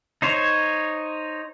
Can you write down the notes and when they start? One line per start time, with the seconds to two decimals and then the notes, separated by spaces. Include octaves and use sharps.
0.22 D#4 C5 C#5